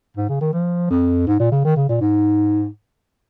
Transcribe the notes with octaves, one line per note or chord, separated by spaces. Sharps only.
G#2
C#3
D#3
F3
F2
G#2
A#2
C#3
D#3
C#3
A#2
G#2